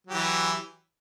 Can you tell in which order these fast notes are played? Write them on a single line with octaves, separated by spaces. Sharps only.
F#3 G4 E3